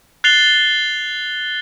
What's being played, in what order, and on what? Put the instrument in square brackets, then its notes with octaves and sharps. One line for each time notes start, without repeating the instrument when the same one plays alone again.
[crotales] F#6 A6 C7 F7 G7